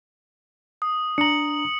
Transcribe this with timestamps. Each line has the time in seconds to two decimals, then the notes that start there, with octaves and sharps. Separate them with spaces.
0.82 D#6
1.18 D4 A#5 C#7 F#7